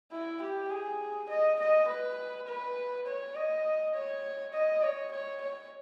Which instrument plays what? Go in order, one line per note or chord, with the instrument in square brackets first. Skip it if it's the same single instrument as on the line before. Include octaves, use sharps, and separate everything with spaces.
[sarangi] E4
G4
G#4
D#5
D#5
B4
B4
C#5
D#5
C#5
D#5
C#5
C#5
C#5